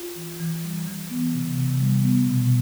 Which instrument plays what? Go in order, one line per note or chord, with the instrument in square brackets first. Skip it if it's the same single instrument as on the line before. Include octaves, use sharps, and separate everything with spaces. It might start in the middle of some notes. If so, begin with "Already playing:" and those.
Already playing: [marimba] F4
E3
E3
G3
E3
B3
C3
C3
G3
B3
B2